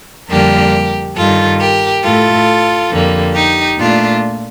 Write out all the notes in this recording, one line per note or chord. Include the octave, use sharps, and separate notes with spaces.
F2 D3 G3 A#3 G4 A#4
G2 D#3 G3 F4 A4
G4 A#4
A2 A3 F4 A4
F2 D3 G3 A#3
D#4 G4
A#2 A3 D4 F4